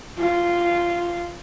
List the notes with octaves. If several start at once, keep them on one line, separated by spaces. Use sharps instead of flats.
F4